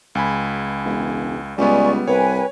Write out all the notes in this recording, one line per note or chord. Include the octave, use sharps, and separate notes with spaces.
C#2 G#5 B5
E1
C#2 G3 B3 D5 G#5 C#6
C2 B4 C#5 G5 G#5